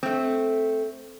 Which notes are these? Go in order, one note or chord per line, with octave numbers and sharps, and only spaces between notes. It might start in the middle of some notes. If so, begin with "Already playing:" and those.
A3 C4